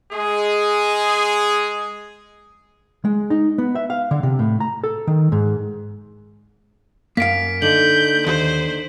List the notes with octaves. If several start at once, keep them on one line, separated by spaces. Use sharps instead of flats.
G#3 G#4
G#3
D#4
B3
E5
F5
D3
C3
A2
A#5
A4
D#3
G#2
F#2 A#3 F5 B6 D7
D3 D#4 G6 F#7
D#2 C5